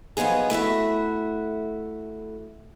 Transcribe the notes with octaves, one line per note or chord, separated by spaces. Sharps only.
F3 F#3 B3 D#4 G#4
A3 E4 F#4 E5